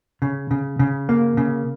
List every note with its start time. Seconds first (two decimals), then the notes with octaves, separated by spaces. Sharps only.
0.22 C#3
0.51 C#3
0.79 C#3
1.09 A#3
1.37 C#3